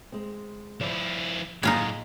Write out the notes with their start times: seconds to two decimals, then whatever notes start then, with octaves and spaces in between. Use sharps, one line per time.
0.12 G#3 C4
0.81 F3 E4 C#5 D5
1.63 A2 F#3 G#3 A#3 D#4 F4 G#5